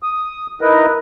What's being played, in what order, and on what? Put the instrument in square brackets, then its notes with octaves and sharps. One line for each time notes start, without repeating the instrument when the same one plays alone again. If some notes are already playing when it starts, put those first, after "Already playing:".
[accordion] D#6
D#4 E4 A#4 B4 D#5